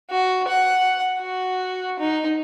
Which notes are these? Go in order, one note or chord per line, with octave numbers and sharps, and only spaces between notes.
F#4
F#5
F#4
D#4